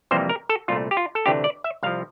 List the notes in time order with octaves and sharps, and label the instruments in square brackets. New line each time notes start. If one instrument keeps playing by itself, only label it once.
[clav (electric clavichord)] F2 C3 E3 G3 A#3 C5
A#4
A4
C2 A#2 A3 F4
G4
F4
A4
D2 C3 E3 A3 D4 G4
D5
E5
C2 C3 F3 F5